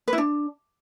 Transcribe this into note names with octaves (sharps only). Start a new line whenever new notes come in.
B4
E4
D4